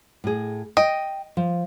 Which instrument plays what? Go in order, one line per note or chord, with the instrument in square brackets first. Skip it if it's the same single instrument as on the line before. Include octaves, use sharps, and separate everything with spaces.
[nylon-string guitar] A2 G#4
[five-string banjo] D#5 [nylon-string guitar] G5
[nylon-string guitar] F3